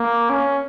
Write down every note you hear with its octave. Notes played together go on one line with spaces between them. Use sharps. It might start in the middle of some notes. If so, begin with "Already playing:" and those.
Already playing: A#3
C#4